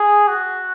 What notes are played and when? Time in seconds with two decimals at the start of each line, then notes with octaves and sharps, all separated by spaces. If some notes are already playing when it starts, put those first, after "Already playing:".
Already playing: G#4
0.28 F#4